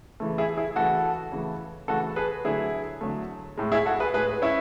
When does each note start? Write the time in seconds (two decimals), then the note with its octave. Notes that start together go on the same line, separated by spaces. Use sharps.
0.20 C#3 E3 A3
0.38 E4 G#4
0.57 E4 G#4
0.76 C#3 E3 A3 F#4 A4
1.32 C#3 E3 A3
1.88 C#3 E3 A3 F#4 A4
2.16 G#4 B4
2.45 D3 F#3 A3 E4 G#4
3.01 D3 F#3 A3
3.58 A2 G#3
3.72 E4 G#4
3.86 F#4 A4
4.00 G#4 B4
4.14 A2 G#3 G#4 B4
4.42 C#4 E4